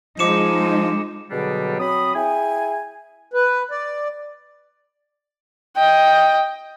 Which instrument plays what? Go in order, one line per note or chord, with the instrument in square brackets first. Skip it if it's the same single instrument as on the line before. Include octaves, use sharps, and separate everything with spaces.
[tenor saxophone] F3 [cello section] G#3 D#4 [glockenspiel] D6 C#7 E7
[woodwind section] B2 D3 F#3 G3 D4 G#4
F#3 C4 B5 D#6
E4 G#4 G5 G#5
[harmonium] B4
D5
[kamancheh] D#5 G5